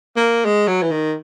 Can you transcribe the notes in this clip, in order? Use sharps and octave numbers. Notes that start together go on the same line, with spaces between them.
A#3
G#3
F#3
E3
D#3